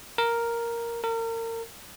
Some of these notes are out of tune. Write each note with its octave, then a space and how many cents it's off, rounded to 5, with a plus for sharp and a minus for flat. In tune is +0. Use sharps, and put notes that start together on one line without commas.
A#4 +0
A#4 -35